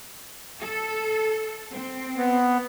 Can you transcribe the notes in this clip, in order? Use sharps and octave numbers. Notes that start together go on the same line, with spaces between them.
A4
C4
B3